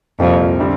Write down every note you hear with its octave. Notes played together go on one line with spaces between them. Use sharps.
C2 F2 A#2 G3 A#3
D3 G3 C4